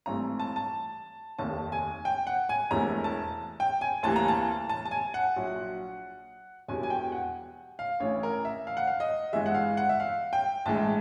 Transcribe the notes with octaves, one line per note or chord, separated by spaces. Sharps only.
G#1 G2 E3 A3 A#5
A5
A5
F1 D#2 D#3 A5
G#5
G5
F#5
G#5
E1 E2 C3 E3 A3 A#5
A5
G5
G#5
D2 C3 E3 G3 A#3 A5
A#5
A5
A5
A5
G#5
F#5
A#1 A#2 F#3
E1 E2 B2 G3 G#5
G#5
G5
F#5
F5
A1 A2 E3 C#5
A#4
E5
F5
F#5
F5
D#5
G1 G2 E3 G#3 E5
F#5
F5
F#5
E5
F5
G5
A#1 A2 E3 G#3 A5